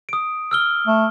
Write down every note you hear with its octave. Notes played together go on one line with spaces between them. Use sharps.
D#6 D7
E6 F6 G7
A3